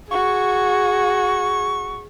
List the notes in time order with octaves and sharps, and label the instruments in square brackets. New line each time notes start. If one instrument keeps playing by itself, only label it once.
[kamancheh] F#4 [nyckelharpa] G#4 [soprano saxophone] C#6